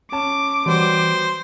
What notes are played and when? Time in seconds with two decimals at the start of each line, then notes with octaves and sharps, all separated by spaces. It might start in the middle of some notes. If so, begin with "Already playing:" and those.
0.12 C#4 A5 D6
0.66 E3 F#3 G3 B3 C5